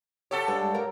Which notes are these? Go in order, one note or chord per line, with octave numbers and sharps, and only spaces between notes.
G4 A4 C#5 F#5 A5
G2 G#3
A#3 A#4